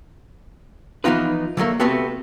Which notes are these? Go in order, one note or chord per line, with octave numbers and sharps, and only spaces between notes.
E3 F3 B3 D#4 F4 B4
D3 F#3 A3 A#3
C3 A3 B3 C4 F#4 A4